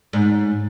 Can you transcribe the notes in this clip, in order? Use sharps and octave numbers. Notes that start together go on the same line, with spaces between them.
G#2